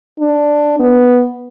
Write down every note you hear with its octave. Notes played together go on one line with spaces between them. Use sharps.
D4
B3